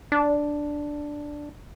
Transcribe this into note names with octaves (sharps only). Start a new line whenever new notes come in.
D4